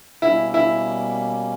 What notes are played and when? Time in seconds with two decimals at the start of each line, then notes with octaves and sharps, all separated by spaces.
0.22 B2 G3 A#3 C#4 E4
0.54 E4